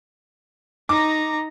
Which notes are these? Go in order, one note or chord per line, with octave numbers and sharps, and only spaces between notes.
D#4 A#5 D6